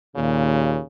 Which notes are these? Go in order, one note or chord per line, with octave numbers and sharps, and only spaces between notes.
D#2 A#2 C#3